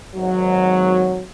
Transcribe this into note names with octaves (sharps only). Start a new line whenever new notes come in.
G#1 F#3